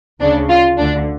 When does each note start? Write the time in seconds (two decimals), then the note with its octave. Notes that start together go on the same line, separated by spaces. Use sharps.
0.20 D2 C#3 D4
0.49 F4
0.78 D2 D3 D4